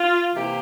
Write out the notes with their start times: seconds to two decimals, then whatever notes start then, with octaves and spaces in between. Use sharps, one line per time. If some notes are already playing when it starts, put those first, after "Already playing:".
Already playing: F4
0.35 C3 E3 A#3 E4 G4